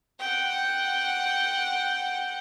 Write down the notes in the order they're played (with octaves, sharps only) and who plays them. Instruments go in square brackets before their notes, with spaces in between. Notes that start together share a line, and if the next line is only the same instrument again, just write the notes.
[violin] F#5 G5